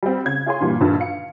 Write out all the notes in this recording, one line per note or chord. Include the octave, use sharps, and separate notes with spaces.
G3 C4
C#3 G#6
F4 G#4 C#5 G#5 C6
G2 A#2 E3 G3
A#1 G2 D3 D#3
F5 C#7